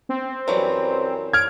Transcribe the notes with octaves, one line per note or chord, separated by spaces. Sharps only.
C4
F#2 E3 F#3 G3
F6 G#6 D7